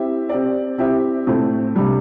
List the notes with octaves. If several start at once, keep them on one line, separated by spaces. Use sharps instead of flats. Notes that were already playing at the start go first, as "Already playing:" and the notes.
Already playing: C4 E4 G4 E5
C4 G4 D5
C4 E4 G4 E5
A2 A3 C4 E4
C3 G3 D4